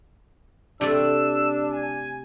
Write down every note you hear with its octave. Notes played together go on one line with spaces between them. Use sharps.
C3 A3 D4 D5 E6
G#5